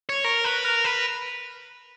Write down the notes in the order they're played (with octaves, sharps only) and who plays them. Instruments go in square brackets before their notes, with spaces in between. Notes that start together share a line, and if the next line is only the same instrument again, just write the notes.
[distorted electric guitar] C#5
A#4
B4
A#4
B4